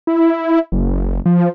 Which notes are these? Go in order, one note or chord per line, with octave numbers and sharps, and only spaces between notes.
E4
F#1
F3